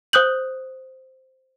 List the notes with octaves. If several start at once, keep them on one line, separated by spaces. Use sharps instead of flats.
C5 D#6 F#6 G6 F#7